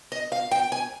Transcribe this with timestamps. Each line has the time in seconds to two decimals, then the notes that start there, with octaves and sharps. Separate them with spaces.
0.12 D#5
0.32 F5
0.51 G5
0.72 G#5